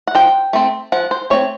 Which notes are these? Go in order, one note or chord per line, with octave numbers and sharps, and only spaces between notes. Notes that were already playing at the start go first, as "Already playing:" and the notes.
F#5
F3 G5
A3 C4
F3 F#5
C5
A3 C4 C#5